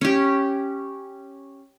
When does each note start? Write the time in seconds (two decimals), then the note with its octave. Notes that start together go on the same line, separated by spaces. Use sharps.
0.01 C#4 G4